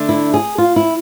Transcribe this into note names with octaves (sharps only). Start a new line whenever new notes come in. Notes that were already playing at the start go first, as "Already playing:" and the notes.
Already playing: D3 A3 D4
E4
G#4
F4
E4